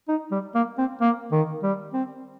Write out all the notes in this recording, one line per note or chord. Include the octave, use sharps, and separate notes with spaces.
D#4
G3
A#3
C4
A#3
D#3
G3
C4